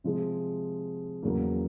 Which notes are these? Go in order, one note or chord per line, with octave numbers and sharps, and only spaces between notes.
C3 F3 G#3
E2 C#3 F#3 A#3